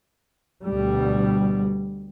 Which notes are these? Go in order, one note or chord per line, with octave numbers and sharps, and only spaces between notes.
D2 B2 G3